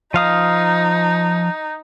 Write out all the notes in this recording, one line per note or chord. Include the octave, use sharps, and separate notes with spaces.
F3 D#4 F5 D#6